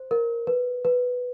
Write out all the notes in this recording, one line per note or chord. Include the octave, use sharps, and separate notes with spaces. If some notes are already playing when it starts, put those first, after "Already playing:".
Already playing: C5
A#4
B4
B4